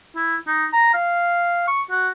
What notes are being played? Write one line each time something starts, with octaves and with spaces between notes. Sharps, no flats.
E4
D#4
A#5
F5
C#6
F#4